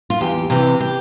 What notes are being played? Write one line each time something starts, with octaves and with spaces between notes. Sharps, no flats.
F4
E2 G4
C3 E3 G4
G4